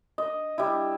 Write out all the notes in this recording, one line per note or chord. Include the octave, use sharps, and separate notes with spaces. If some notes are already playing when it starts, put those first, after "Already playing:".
D#5
G3 E4